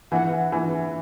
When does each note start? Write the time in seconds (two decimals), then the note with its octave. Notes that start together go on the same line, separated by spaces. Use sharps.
0.12 E3 F#5
0.52 E3